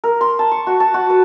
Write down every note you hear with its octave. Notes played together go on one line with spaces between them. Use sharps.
A#4
C6
A5
C#6
F#4
A5
F#4
B4